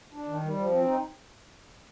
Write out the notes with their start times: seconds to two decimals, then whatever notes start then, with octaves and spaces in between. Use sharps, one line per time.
0.13 D4
0.27 D#3
0.43 G3
0.56 F3
0.71 C4
0.85 D#4